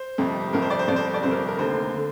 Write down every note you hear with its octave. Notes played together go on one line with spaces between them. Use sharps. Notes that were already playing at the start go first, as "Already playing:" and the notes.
Already playing: C5
G1 F2 C3
G1 F2 C3 A#4
C5
D5
C5
G1 F2 C3 D5
C5
D5
G1 F2 C3 C5
A#4
A#4
F1 D#2 D3 C5
D3